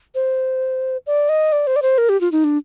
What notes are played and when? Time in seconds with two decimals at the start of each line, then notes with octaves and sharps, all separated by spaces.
0.15 C5
1.06 D5
1.29 D#5
1.52 D5
1.67 C5
1.76 D5
1.82 C5
1.98 A#4
2.09 G4
2.21 F4
2.32 D#4
2.44 D4